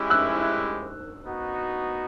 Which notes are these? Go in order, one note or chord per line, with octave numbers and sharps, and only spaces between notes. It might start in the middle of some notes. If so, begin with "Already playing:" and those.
Already playing: G#3 C#4 E4 G4
E6 F#6
B3 D#4 F#4